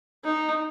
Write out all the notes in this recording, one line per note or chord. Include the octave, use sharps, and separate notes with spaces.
D#4